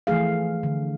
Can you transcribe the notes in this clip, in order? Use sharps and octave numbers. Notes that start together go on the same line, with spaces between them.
E3 F3 A3 G#4 F5
D3